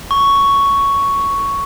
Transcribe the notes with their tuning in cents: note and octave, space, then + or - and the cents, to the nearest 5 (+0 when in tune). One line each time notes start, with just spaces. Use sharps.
C#6 +5